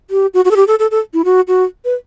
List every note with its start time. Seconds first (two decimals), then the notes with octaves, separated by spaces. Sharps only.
0.10 G4
0.34 F#4
0.45 F#4
0.51 A4
0.56 G4
0.67 A4
0.79 A4
0.91 A4
1.13 E4
1.25 F#4
1.48 F#4
1.85 B4